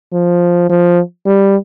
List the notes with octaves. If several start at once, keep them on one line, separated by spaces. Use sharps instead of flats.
F3
F3
G3